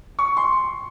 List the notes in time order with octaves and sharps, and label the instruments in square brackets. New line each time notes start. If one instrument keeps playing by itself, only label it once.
[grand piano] C#6
C6